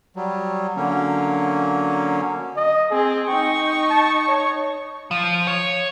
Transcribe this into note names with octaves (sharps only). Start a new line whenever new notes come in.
F#3 G3
D3 F#3 A#3 C#4
D#5
C4 G#4
D#4 G5 C#6
A5
C#5
F3
C#5